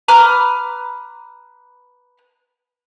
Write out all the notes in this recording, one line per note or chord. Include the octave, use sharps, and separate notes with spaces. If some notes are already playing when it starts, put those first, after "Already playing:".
B4 A#5 D6 F6